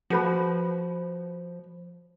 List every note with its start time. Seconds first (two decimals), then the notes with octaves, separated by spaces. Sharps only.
0.10 F3 F#4 B4 B5